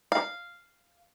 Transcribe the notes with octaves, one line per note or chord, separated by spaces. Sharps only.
F5